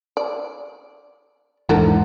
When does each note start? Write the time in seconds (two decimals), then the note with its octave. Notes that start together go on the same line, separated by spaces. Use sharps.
0.17 D5
1.69 E1 G#2 D3 E3 D4 A#4